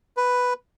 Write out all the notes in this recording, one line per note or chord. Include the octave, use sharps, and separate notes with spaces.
B4